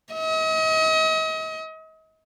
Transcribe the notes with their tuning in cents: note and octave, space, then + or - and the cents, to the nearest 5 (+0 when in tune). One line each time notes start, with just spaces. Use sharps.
D#5 +40